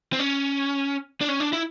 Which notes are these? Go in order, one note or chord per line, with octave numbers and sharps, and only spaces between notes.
C4
C#4
D4
C#4
D4
E4